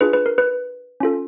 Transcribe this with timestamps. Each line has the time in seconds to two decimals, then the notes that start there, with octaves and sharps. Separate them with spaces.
0.01 D4 F4 G#4 B4
0.13 B4
0.26 A#4
0.38 B4
1.00 C#4 F4 A4